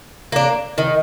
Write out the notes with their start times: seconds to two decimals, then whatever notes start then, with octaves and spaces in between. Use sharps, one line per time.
0.32 A#3 D4
0.78 D#3